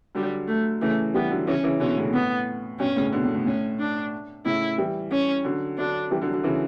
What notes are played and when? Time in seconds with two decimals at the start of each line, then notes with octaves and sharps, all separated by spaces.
0.15 D3 F#3 G3
0.48 A3
0.81 C#3 E3 A3
1.14 E3 G3 B3
1.31 D3 F#3
1.47 C#3 E3 C#4
1.64 C#3 E3
1.80 B2 D3 C#4
1.97 A2 C#3
2.13 A2 B3
2.79 G2 B2 C#4
2.96 A2 C#3
3.13 B2 D3
3.24 A2
3.35 A2
3.46 A2 C#4
3.79 D4
4.45 A2 C#3 E4
4.78 E3 G3
5.11 C#4
5.44 D3 F#3
5.78 D3 F#3 D4
6.11 E3 G3
6.22 D3 F#3
6.34 D3 F#3
6.44 C#3 E3